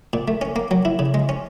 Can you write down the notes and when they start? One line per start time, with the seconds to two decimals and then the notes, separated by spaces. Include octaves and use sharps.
0.13 A#2
0.28 A3
0.42 C#4
0.56 A#3
0.71 F#3
0.85 E4
0.99 C#3
1.14 G#3
1.29 C#4